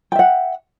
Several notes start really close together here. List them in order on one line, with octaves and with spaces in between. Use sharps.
G5 E5 F#5